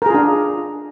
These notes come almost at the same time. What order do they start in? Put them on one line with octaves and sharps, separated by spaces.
A#4 G#4 F4 D4